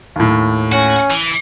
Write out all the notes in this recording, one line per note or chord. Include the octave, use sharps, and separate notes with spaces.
D#2 A2
C#4 F#4
E3